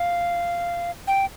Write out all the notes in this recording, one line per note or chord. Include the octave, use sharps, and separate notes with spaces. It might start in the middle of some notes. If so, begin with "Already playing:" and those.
Already playing: F5
G5